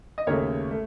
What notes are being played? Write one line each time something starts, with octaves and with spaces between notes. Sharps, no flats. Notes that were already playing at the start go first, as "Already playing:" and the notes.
D#5
D#2 C#3 A3 A#4 C#5
A3